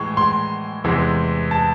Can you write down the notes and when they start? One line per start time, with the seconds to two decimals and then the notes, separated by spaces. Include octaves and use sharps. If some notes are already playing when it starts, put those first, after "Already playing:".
Already playing: A2 E3 G#3 C#6
0.17 C6
0.84 E2 C3 E3 G#3
1.51 A5